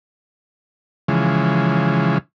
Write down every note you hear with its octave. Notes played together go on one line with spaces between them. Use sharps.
C#3 E3 F3 G#3